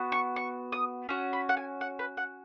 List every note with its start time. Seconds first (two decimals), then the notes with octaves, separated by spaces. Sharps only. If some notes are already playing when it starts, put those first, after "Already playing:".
Already playing: B3 F#4
0.12 C#6
0.36 C#6
0.72 D#6
1.09 C#4 F#4
1.33 B5
1.49 F#5
1.57 G#5
1.81 F#5
1.99 B4
2.17 F#5